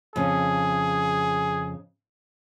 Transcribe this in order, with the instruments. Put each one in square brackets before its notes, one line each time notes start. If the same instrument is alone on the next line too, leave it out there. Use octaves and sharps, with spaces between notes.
[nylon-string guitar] F2 C#3 [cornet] G#4